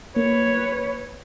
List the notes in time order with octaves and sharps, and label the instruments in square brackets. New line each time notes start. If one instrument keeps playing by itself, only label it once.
[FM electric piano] A#3 [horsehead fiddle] B4 C#5